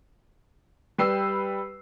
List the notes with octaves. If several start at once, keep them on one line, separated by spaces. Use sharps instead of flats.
G3 B4 G5 E6 C7